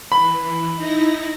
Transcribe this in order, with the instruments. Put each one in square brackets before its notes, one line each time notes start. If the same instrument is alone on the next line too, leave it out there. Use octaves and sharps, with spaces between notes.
[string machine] E3 [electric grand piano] B5
[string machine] D#4 E4 A#6